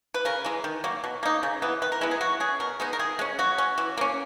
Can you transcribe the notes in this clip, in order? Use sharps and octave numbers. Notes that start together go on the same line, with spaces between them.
B4
C#3 A#4
E3 G#3
D#3
F#3 A#3
B2
A#3 D#4
C#3
E3 B3
D#3 B4
A#4
G#3 B3 E4
G#4
F#3 F#4
C#4 G#4
B2 A#4
G#3 B3 D#4
A#4
D#3 G#4
G#3 C#4
F#3 F#4
C#4
E3
A#3 C#4